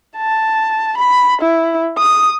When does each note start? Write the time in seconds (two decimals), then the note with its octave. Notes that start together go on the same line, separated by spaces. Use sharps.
0.17 A5
0.97 B5
1.41 E4
1.98 D#6